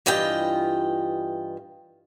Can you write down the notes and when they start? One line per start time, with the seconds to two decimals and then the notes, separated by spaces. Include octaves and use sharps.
0.06 G2 E3 F4 D#5 G5